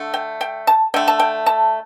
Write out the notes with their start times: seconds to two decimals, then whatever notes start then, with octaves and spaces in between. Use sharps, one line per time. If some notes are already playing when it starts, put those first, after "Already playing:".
Already playing: D3 A3
0.14 G5
0.41 G5
0.67 A5
0.94 D3 A3 G5
1.08 A5
1.19 G5
1.46 A5